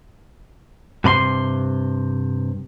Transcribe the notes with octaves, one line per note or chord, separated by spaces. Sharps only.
G2 C3 B5 C6